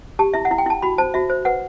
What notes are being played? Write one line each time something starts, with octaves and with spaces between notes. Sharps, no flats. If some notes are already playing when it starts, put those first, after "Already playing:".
G4 A5
E4 E5
F#5
E4
G5
E4 A5
F#4 B5
C5 A5
F#4 E5
C5
B4 F#5